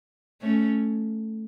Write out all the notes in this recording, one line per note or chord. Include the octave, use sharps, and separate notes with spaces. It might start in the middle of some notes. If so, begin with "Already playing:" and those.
A3 C#4